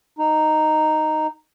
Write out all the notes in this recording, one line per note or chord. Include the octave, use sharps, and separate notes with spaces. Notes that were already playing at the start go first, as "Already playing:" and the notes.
D#4